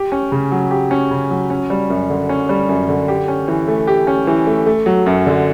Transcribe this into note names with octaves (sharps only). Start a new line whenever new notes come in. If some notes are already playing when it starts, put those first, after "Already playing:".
Already playing: G4
C#4
C#3
F#3
G4
C#4
C#3
F#3
C#4
G3
F#2
D3
C#4
G3
F#2
D3
G4
C#4
E3
A3
G4
C#4
E3
A3
A3
F#3
F#2
D3